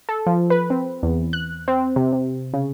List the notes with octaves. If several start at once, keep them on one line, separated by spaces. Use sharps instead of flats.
A4
F3
B4
C4
E2
F#6
C4
C3
C3
C#3